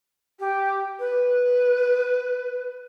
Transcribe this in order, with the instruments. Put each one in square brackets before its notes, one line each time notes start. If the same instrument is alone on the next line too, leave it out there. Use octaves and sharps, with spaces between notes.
[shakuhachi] G4
B4